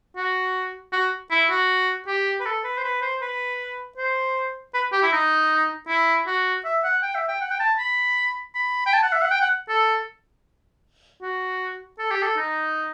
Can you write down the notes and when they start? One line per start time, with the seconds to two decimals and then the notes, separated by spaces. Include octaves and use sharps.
0.16 F#4
0.93 F#4
1.31 E4
1.51 F#4
2.07 G4
2.40 B4
2.45 A4
2.64 B4
2.78 C5
2.84 B4
3.02 C5
3.22 B4
3.97 C5
4.74 B4
4.92 G4
5.02 E4
5.12 D#4
5.88 E4
6.27 F#4
6.65 E5
6.84 F#5
7.02 G5
7.15 E5
7.28 G5
7.41 F#5
7.51 G5
7.60 A5
7.78 B5
8.55 B5
8.86 G5
8.93 A5
9.03 F#5
9.12 E5
9.22 F#5
9.31 G5
9.41 F#5
9.69 A4
11.22 F#4
11.99 A4
12.11 G4
12.22 A4
12.37 D#4